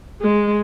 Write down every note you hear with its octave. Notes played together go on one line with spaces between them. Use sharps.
G#3